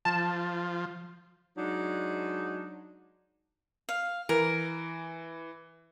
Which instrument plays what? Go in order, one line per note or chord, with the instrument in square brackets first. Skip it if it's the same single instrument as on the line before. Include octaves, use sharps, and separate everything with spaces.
[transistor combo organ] F3 [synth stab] A5
[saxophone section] F#3 G#3 D4 D#4
[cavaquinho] F5
[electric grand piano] E3 [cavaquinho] A#4